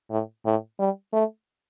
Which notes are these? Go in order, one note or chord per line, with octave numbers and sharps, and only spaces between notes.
A2
A2
G3
A3